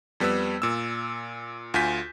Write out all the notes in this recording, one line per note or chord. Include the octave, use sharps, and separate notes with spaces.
F2 G3 B3 B4 E6
A#2 E6
D2 F4 G#5 G6 B6